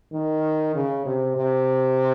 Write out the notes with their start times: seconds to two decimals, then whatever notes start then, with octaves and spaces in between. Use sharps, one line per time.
0.12 D#3
0.75 C#3
1.05 C3
1.36 C3